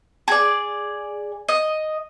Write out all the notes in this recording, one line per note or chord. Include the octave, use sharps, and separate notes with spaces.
G#4 D5
D#5